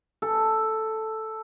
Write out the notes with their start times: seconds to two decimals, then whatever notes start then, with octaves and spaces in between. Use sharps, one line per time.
0.22 A4